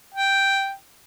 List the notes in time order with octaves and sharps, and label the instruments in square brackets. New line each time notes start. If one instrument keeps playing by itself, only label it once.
[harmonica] G5